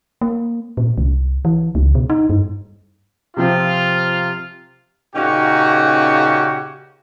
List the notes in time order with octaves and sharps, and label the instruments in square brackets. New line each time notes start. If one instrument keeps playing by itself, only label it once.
[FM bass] A#3
A#2
C2
E3
C#2
B2
D#4
G2
[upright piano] C3 F3 C4 [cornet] F4
[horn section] A#2 C#3 C#4 D#4 F#4 G4